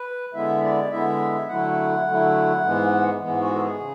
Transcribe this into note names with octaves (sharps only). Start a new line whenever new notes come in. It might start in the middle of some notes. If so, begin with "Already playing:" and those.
Already playing: B4
D3 G#3 B3 E4 E5
D5
D3 G#3 B3 E4 E5
D3 F#3 A3 E4 F#5
D3 F#3 A3 E4
G#2 E3 G#3 B3
G#2 E3 G#3 B3
F#4
A4
G#4
C#3